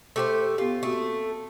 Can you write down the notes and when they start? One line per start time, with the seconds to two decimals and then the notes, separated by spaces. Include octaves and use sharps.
0.16 A3 G4 C5
0.58 B3 F4 G4
0.83 A3 A#3 C4 F#4